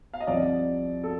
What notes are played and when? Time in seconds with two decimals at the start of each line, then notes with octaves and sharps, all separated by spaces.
0.14 F5
0.20 D#5
0.27 C2 C3 F3 D5
1.04 A4